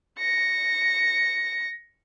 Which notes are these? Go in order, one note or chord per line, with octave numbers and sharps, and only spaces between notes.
A#6 C#7